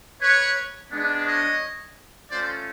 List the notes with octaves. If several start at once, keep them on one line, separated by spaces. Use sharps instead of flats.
B4 C#5
G#3 B3 D4
C#5 D#5
A3 C#4 F4 C5 D5